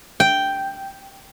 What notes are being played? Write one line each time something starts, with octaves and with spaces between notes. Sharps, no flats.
G5